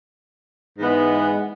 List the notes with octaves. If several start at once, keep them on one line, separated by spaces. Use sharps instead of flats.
G#2 E3 G#3 B3